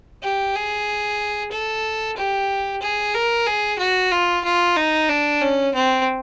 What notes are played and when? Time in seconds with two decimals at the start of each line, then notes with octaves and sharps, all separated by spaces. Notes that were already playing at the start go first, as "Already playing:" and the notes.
0.23 G4
0.55 G#4
1.52 A4
2.17 G4
2.82 G#4
3.14 A#4
3.47 G#4
3.79 F#4
4.12 F4
4.44 F4
4.76 D#4
5.09 D4
5.41 C#4
5.74 C4